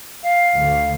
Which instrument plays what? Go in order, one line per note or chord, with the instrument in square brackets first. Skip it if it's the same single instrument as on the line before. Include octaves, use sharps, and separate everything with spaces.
[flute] F5
[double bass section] D2